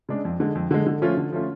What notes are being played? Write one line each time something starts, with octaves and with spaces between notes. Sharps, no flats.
C#3 G#3 D4
F2
D3 G#3
F2
D3 G#3
D3
F3 A3 C#4 F4
D3
F3 A3 C#4 F4